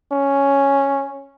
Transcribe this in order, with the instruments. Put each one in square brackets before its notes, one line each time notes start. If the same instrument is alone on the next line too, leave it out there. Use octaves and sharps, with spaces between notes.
[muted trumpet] C#4